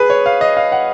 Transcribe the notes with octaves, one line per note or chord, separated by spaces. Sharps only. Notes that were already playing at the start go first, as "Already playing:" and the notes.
Already playing: G#4 B4
C#5
F5
D#5
F5
F#5